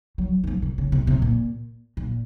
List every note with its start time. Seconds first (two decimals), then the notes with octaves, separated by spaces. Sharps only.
0.18 F#3
0.44 E3
0.47 F3
0.62 C3
0.78 C#3
0.92 C3
1.07 C3
1.22 A#2
1.97 A#2